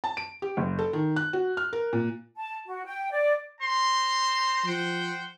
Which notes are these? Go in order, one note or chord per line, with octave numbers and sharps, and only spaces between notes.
A5
D7
G4
F#1
A4
D#3
F#6
F#4
F6
A#4
A#2
A5
F#4
G5
D5
C5 A#5 C6
F3 C5 F#5 G5